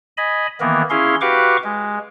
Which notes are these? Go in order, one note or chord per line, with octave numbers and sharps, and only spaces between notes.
D#5 G#5 B5
D#3 E3 A#3 B3 A#4
C#4 E4 G#4 F5 C6
F#4 G4 B4 F5 C#6 D6
G#3